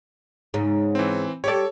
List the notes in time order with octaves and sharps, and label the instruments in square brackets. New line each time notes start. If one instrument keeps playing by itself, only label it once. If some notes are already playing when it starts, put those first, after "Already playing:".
[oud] G#2 C#3
[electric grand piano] E3 C4
[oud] G3 G4 D5 [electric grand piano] A4 C#5